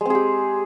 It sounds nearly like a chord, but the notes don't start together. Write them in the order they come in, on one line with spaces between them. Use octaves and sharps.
G#3 C4 G#4 G4